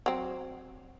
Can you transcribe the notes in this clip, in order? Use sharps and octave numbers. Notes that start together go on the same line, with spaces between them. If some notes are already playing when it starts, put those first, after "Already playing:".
F#3 C4